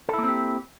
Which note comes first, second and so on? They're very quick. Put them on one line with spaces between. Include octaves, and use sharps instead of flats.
A4 E4 A#3 C4 G4